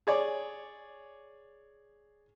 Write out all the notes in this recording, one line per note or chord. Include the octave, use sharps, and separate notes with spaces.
G#4 C#5 D5